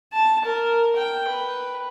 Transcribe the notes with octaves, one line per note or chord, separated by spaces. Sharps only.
A5
A#4
G5
B4